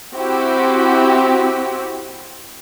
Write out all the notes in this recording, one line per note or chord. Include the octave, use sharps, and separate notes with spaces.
C4 E4 F#4 G4